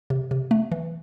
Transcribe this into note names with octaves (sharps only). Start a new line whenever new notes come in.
C3
C3
A3
E3